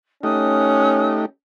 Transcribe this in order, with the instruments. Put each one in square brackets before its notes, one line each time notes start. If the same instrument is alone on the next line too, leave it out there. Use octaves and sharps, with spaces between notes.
[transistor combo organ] A3 D#4 G4 [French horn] C#4 [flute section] D#6 F6 F#6